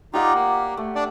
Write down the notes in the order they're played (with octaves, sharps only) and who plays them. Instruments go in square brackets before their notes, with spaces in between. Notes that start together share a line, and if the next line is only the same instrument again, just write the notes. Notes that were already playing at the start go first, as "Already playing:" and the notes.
[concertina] D#4 F4 [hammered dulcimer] G4 D5 F#5
[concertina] A#3
[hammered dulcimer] A3
[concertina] D4 D5